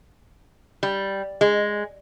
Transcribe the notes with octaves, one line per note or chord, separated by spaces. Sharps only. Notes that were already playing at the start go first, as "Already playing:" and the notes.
G3
G#3